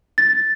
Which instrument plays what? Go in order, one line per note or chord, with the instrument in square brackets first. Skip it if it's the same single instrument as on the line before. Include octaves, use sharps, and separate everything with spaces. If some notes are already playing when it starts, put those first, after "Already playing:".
[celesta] A6